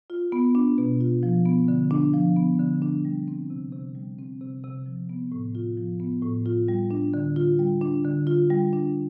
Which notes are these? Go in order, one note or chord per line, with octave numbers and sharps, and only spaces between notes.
F4
B3
D4
B2
F4
F3
B3
D3
D4
F3
B3
D3
D4
G3
C4
C3
C3
G3
C4
C3
C3
F3
B3
A2
F4
F3
B3
A2
F4
G3
D4
D3
F4
G3
D4
D3
F4
G3
D4